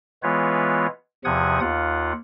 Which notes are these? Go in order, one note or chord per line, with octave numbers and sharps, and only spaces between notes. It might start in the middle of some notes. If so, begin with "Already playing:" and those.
E3 G#3 B3 F4 B4 C#5
E2 C3 F3 F#5 D#6 G#6
D#2 F4 F#5